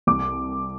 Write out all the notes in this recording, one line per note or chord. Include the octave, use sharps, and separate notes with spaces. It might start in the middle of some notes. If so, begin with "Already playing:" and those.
C2 D6